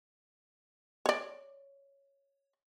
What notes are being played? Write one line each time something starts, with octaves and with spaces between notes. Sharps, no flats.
C#5 D5